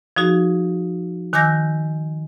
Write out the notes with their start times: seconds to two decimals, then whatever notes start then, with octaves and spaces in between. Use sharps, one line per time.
0.16 F3 D#4 F#4 G#4
1.33 D#3 G#5 D6 E6 G6 A#6